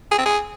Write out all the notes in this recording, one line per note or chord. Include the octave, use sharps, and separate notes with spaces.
G#4
C4
G#4